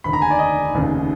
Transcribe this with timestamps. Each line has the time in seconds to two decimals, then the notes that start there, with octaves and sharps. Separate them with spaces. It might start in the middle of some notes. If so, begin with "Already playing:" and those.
0.04 F1 D#2 D3 B5
0.13 A#5
0.22 G#5
0.30 D5
0.39 D#5
0.74 F1 D#2 C#3